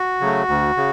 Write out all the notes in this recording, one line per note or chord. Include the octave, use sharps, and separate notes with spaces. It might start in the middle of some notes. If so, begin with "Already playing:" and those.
Already playing: F#4
C#3 F#3 A3
D2
C#3